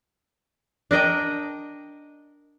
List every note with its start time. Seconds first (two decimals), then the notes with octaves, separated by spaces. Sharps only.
0.91 D4 A#4 D#5 G5